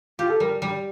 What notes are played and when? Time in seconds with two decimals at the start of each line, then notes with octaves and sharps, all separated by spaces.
0.19 F4 G4
0.30 A4
0.40 G3 A#4
0.62 G3